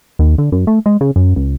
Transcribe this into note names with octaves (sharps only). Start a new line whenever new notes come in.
D#2
D3
F#2
A3
G#3
C#3
F#2
C#2